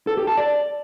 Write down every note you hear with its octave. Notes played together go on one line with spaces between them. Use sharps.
A4
G4
A5
D5